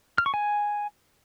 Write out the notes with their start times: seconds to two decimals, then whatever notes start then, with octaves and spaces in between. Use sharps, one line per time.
0.18 F6
0.26 C#6
0.34 G#5